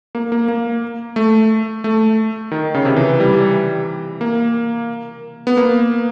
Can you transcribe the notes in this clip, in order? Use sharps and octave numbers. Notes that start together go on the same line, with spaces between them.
A#3
A#3
A#3
A3
A3
D#3
C#3
C3
E3
G3
A#3
B3
A#3